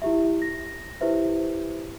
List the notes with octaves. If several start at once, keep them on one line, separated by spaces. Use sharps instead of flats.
E4 G4 E5
A#6
E4 G4 B4 C5 E5